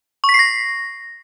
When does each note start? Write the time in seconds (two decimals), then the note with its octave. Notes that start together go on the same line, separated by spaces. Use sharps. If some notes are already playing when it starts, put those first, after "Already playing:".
0.24 C#6
0.29 B6
0.34 C7
0.39 A#6